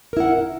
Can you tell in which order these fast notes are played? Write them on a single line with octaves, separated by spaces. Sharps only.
A#4 E4 F#5